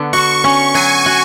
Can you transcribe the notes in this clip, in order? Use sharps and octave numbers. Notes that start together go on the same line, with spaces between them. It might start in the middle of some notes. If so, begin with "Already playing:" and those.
Already playing: D3 B3
F#4 C#6
C#4
F#3 G#5
F#4